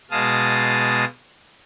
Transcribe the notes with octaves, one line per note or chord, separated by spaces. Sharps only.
B2 G#3 F5 A5 D#6